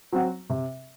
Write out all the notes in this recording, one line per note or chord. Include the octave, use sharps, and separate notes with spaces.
F#3 C4 F#4
C3